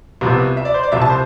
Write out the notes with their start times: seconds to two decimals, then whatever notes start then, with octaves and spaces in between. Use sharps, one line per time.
0.21 C2 C3 F3 B3
0.57 E5
0.65 D5
0.74 C5
0.83 D5
0.92 C2 C3 F3 E5
1.02 A5
1.09 C5